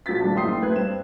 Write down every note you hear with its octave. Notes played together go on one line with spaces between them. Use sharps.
A#1 F#3 F4 A6 B6
D#1 G2 D4 A5
F#1 A2 G5 C6 D#6 C7
A3 B4 F#6 G#6
G2 C4 E7